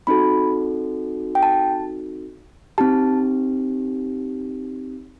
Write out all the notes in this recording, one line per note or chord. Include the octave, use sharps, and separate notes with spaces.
C4 D#4 F#4 A4 B5
G5
A5
C4 D#4 G4 A5